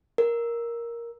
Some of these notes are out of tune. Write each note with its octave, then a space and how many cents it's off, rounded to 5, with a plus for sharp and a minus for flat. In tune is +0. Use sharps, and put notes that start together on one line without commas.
A#4 +5